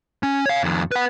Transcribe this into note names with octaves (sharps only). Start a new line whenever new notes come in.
C#4
C#5 F5
F2 D#3
B4 F#5